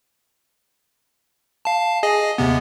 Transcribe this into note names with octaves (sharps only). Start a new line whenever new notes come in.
F5 A5
G#4 D#5 G#5
D#2 C3 B3